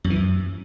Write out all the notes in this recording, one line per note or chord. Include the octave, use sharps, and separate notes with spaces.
F#2
E3
F#2